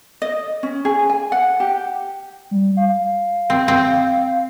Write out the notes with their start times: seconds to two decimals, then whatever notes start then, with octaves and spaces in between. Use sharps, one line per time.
0.22 D#5
0.63 C#4
0.85 G#4
1.10 G#5
1.32 F#5
1.60 G4
2.51 G3
2.77 F5
3.50 C4
3.68 C4